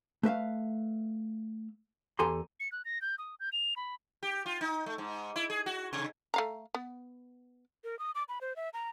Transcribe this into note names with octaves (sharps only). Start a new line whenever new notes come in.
A3 B4 E5 F5
E2 G4 A4 G#5 A#5 C6
C#7
F#6
A#6
G6
D#6
G6
F7
B5
G4
F4
D#4
A3
G#2
E4
G#4
F#4
C3
A3 F5 A#5
B3
A#4
D#6
D6
B5
C5
E5
A#5